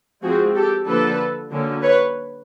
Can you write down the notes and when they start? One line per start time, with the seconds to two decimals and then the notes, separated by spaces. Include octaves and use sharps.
0.23 F3 G#3 C4 F#4 G#4
0.56 G4 A4
0.87 D3 F3 A#3 D4 A4 B4
1.51 D3 F#3 A#3 C#4
1.82 B4 C#5